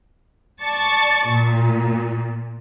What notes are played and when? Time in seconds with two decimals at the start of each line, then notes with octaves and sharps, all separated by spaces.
0.62 D5 A5 C#6 A6
1.28 A#2